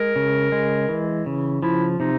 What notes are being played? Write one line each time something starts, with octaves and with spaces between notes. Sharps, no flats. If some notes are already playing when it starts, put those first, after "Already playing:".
Already playing: G#3 A#4
C#3
G#3
E3
C#3
F3 E4
C3 D#4